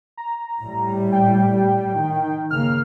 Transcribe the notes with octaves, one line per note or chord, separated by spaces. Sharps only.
A#5
A2 G3
G5
D#3
C#3 A#3 F6